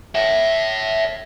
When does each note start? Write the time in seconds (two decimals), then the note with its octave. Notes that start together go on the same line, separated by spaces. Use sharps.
0.15 C#5 E5